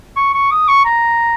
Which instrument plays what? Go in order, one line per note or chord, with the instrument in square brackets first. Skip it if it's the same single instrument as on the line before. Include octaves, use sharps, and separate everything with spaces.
[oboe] C#6
C#6
D#6
C#6
A#5